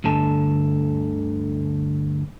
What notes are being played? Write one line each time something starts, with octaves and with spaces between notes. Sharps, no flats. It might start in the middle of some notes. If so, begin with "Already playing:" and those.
D2 G2 D3 A4